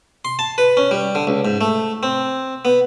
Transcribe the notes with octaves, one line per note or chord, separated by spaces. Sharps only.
C6
A5
B4
C#4
G3
D3
C#2
G#2
A3
C4
B3